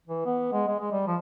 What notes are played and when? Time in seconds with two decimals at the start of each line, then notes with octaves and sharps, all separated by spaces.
0.08 E3
0.26 B3
0.53 G#3
0.67 G#3
0.79 G#3
0.92 G3
1.07 F3